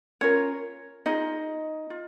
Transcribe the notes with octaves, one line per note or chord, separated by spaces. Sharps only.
C#4 F4 A#4 C#5
D#4 F4 G#4 D#5
F4